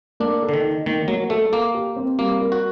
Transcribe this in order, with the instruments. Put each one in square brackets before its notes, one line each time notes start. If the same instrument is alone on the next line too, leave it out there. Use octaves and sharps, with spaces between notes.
[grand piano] A#3 [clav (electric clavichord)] D4
[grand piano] A4
[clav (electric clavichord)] D3
D#3
[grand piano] D#4
[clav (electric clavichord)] D#3 [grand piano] A#3
[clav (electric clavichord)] F#3 [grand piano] A#3
[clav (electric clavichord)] A3 [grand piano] A4
[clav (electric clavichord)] A#3 [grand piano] A#4
[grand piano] G4
C4
[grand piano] G3 [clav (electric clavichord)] A#3
[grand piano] A#4
[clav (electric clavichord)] F#4